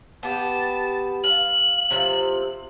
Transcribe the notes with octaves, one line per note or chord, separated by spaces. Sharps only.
B3 G4 A5
F5 F#7
C3 F3 E5